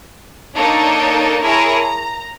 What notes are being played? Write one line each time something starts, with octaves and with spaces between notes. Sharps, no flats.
A#3 D4 D#4 A4 C#5 A5
E4 G#4 A#4 C#5 A5 A#5
A#5